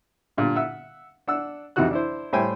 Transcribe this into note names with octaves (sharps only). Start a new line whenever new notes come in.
G2 A#2 D3
E5 F#5 E6
D4 F#5 E6
F2 C3 E3 D#4 F#4 F#6
D4 E4 C5
A2 G3 C5 G5 G#5